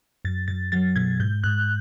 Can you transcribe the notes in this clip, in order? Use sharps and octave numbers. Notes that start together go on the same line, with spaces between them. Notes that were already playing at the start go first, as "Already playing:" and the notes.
F#2 A6
F#2 A6
F#3 A6
B2 G#6
G#2 G6
G#2 F#6